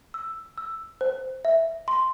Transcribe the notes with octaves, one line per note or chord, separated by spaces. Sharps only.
E6
E6
C5
E5
C6